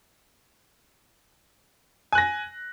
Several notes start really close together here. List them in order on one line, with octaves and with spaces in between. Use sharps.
G#5 F#6 A#6